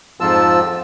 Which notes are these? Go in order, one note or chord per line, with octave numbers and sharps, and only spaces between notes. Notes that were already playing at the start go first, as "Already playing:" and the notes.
F2 G#2 F3 F4 A5 E6